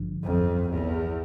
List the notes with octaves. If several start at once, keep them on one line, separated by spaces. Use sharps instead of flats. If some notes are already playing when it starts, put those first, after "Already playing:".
Already playing: A1 G2 D3 F3
F2
E2